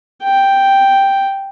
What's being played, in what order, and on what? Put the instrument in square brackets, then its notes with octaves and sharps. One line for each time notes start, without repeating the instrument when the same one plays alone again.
[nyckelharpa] G5